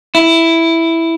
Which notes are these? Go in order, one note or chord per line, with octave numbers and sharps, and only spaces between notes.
E4